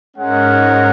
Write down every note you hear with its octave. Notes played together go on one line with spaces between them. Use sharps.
G#2 G#3 C#4 A#4 F#5